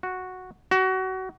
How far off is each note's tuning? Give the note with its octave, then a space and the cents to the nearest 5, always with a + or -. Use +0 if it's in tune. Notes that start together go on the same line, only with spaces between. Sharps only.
F#4 -5
F#4 +25